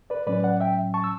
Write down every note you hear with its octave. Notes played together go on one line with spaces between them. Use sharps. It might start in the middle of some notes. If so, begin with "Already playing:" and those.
B4 D5
A2 F#3 C#4 B4 D5
D5 F#5
E5 G5
A5 C#6
E6